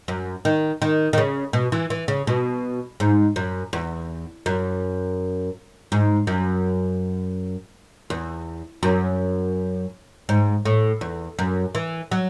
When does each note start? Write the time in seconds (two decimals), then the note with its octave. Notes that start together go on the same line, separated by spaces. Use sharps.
0.08 F#2
0.45 D#3
0.82 D#3
1.13 D#3
1.18 C#3
1.53 B2
1.72 E3
1.90 E3
2.08 C#3
2.27 B2
3.00 G#2
3.36 F#2
3.73 E2
4.46 F#2
5.92 G#2
6.27 F#2
8.10 E2
8.83 F#2
10.29 G#2
10.65 A2
11.01 E2
11.39 F#2
11.75 E3
12.12 F#3